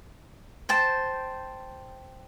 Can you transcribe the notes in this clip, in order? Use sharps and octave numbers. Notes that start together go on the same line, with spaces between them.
C5 G5 A5